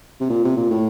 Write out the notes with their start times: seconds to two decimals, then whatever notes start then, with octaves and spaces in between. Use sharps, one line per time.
0.21 C3
0.29 A#2
0.45 C3
0.57 A#2
0.71 A2